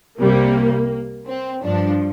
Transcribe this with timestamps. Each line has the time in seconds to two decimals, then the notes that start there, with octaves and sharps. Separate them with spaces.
0.19 C2 C3 G3 A#3
1.27 C4
1.62 G2 F3 D4